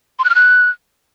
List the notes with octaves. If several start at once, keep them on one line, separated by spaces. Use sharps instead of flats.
C6
F#6
F6
F#6